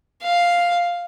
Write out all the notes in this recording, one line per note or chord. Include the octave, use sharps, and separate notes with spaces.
F5